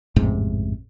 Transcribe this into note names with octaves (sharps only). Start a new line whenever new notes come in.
A1 F2 G#2 C3